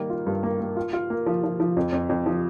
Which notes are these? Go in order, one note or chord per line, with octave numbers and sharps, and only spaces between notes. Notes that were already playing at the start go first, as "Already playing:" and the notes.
Already playing: D#3 G3 A#3
F4
G2
A#3
A#3
F4
F4
A#3
F3
F3
F3
F2
F2
F2
F3